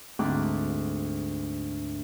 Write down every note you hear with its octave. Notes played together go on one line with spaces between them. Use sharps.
D2 G#2 C4 D6 F#6